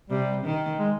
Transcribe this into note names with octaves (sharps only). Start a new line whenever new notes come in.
C3 G3
D#3
G#3